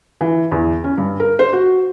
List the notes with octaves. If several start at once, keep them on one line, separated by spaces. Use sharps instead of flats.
E3
E2
C#4
G2
A#4
C5
F#4